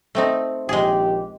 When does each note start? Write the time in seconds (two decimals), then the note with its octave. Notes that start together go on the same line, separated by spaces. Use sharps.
0.15 A3 C4 D#4
0.69 A#1 D#2 G#3 G4 G#4